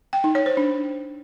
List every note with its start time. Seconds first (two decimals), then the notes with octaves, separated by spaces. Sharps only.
0.13 G5
0.24 D#4
0.35 C#5
0.46 C5
0.57 D4